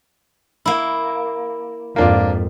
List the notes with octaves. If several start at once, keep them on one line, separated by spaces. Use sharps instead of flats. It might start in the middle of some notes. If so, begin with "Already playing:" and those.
A#3 E4
F2 G#2 A#3 D4 F4